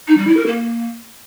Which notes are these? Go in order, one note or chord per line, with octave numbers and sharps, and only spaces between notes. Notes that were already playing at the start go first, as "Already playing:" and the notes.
D#4
G3
E4
A#4
A#3